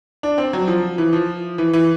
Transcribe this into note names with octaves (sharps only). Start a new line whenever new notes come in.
D4
C4
F#3
F3
E3
F3
E3
E3